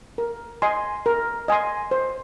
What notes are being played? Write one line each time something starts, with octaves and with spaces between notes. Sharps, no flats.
A#4
D#5 G#5 C6
A#4
D#5 G#5 C6
C5